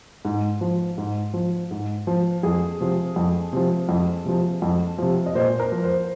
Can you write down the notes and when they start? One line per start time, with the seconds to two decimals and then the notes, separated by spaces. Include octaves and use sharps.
0.25 G#2
0.61 F3
0.98 G#2
1.34 F3
1.71 G#2
2.07 F3
2.43 F2 G#4
2.80 C3 F3
3.16 F2
3.53 C3 F3
3.89 F2
4.25 C3 F3
4.62 F2
4.98 C3 F3
5.26 D#5
5.35 A#2 C5
5.60 A#4
5.72 F3
5.84 C5